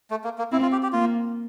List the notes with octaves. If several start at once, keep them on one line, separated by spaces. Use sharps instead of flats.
A3
A#3
A#3
C4 E4
F4
G4
G4
A#3 F4